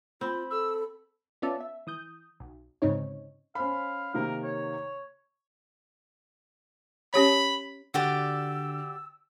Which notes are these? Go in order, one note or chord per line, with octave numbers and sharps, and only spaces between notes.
C4 F4 B5
A4 E6
B3 C#4 F4 D5 E5 A5
E5
E3 D#6 G6
B1
D2 G#2 C#3 C4 D#4 C#5
C#4 C5 F5 B5
C3 D#3 A#3 A#4
C#5
C#4 G4 C#5 B5
D3 F#4 G4 D5 E6